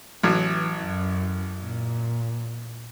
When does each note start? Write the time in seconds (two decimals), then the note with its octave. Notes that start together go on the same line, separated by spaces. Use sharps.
0.23 A1 E3 F#3
0.82 F#2
1.62 A#2